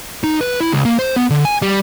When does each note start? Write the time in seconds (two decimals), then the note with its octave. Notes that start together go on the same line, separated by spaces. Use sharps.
0.24 D#4
0.41 B4
0.61 E4
0.72 C#2
0.85 A#3
0.99 C5
1.16 B3
1.30 D3
1.45 G#5
1.62 G3